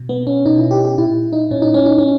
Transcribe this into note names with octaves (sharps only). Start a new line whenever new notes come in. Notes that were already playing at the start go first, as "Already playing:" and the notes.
Already playing: B2
B3
C#4
B2 D#4
E4
G4
G4
A#2 E4
D#4
A#2 C#4
D#4
C#4
D#4
C#4